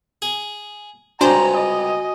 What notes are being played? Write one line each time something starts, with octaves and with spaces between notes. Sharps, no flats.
G#4
C#2 G2 C3 D4 F#4 C5 G#5 A#5
D#5